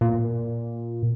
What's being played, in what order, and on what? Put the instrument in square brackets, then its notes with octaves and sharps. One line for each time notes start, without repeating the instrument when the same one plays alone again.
[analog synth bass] A#2